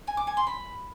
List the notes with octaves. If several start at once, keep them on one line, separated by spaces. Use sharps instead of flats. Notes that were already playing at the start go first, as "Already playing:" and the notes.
G#5
D6
G#5
C6
B5